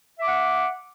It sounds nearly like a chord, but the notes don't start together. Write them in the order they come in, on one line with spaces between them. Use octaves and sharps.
E5 D6 F#5